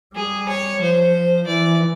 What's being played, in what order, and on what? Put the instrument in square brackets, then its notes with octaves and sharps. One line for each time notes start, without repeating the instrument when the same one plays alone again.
[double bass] G3 [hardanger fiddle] G#4
[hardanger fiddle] C#5
[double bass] F3 [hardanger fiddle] C5
[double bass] E3 [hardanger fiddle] D5